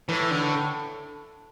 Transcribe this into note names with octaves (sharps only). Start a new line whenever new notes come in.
A2 E3
D3